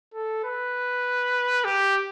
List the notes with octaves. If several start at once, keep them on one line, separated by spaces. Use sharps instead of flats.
A4
B4
G4